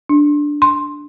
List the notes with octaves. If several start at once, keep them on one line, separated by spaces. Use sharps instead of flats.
D4
C6